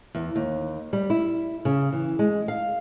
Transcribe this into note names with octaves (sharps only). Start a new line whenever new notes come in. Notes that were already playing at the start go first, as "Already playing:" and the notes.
E2
D#2
G3
E4
C#3
E3
G#3
F5